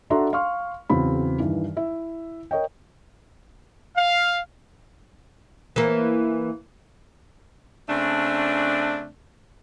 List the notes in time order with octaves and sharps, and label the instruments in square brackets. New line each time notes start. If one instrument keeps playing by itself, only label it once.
[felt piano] D4 F#4 A4 E5 A#5 C6
F5 C6 C#6 F6
E2 C#3 F#3 C4 B5
G2 D#3 E3
E4 E5
A#4 C#5 D#5 G5
[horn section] F5
[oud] E3 A#3
[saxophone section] C#3 A3 C4 D4